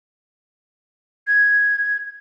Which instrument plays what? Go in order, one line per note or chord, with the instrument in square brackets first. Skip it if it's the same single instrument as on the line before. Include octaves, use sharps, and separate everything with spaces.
[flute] G#6